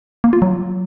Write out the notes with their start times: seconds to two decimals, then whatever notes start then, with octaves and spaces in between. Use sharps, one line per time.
0.24 A#3
0.33 F4
0.42 F#3